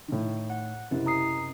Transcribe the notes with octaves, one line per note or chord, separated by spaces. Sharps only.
A2 D#3
F#5
F#1 C3 E4
A#5 D#6 C7